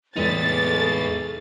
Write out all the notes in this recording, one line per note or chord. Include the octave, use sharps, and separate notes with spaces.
E2 A2 G#3 D#4 G#4 A4 B4 A6